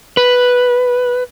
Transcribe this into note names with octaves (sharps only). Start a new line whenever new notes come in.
B4